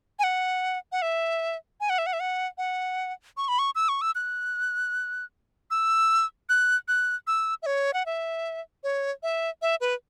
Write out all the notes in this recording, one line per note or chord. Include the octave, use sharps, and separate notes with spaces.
G#5
F#5
F#5
E5
G#5
F#5
E5
F#5
E5
F#5
F#5
C#6
B5
C#6
E6
C#6
E6
F#6
E6
F#6
F#6
E6
E5
C#5
F#5
E5
C#5
E5
E5
B4